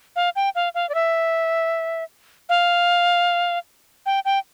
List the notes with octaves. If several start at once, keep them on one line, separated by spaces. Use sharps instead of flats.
F5
G5
F5
F5
D5
E5
F5
G5
G5